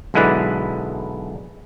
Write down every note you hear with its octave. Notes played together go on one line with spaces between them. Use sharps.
B1 D3 G#3 E4 B4 D5